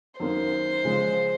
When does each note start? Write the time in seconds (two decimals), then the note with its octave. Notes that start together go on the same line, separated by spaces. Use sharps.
0.20 F#2 D#3 A#3 C5
0.84 C#3 F3 G#3